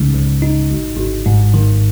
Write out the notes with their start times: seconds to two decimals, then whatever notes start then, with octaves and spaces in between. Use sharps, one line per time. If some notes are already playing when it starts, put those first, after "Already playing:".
Already playing: C#2 C#3 G#3 D#4
0.14 C#2
0.42 D#4
0.70 G#1
0.98 G#1
1.26 G#2
1.54 D#3